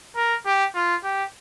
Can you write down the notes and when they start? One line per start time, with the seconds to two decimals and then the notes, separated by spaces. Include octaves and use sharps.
0.16 A#4
0.46 G4
0.75 F4
1.04 G4